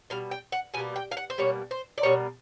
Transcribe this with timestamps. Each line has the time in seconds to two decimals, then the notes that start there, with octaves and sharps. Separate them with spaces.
0.10 B2 G3 F5
0.31 G5
0.52 F#5
0.74 B2 G#5
0.77 G3 A#3
0.96 G5
1.11 F5
1.17 F#5
1.30 C5
1.38 B2 G3 A#3 C#5
1.71 C5
1.98 D5
2.03 B2 G3 A#3 C#5